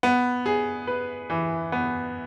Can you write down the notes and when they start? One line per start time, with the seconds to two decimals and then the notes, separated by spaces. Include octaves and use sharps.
0.03 B3
0.46 G#4
0.87 B4
1.30 E3
1.72 B3